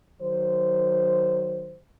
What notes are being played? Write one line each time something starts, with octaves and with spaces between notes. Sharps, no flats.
D#3 F#3 C5